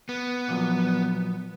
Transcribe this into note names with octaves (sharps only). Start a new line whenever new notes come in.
B3
A#2 F3 F#3